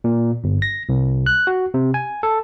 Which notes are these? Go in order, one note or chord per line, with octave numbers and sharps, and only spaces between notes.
A#2
G1
A#6
C2
F#6
F#4
C3
G#5
A4